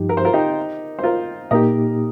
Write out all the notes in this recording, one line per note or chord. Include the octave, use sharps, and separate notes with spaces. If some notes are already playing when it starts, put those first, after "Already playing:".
Already playing: G2 F3 D#4 G4
A#4
C5
F4 A#4
D#4 G4
C5
F4 A#4
A#2 A#3 D#4 G4 A#4 D#5